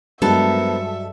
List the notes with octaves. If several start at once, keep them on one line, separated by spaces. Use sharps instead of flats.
G2 F#3 G#3 B3 A4 A#4 C5 E5